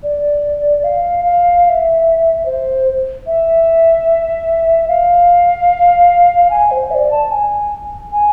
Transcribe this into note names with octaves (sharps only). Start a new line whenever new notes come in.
D5
F5
F5
F5
E5
C5
E5
F5
G#5
C5
E5
D5
A5
G#5
G#5